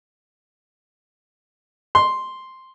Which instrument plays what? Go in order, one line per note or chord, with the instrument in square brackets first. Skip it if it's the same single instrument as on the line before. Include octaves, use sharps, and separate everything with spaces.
[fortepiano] C6